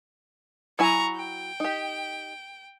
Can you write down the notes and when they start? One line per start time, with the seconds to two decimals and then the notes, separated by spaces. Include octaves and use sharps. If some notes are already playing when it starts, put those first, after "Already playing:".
0.79 F#3 E4 G#5 A#5 C#6
1.16 G5
1.60 D#4 G4